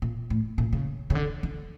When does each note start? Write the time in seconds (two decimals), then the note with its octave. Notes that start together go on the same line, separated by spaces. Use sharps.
0.02 A#2
0.30 A2
0.58 A#2
0.73 C#3
1.10 C#3
1.15 D3
1.43 D3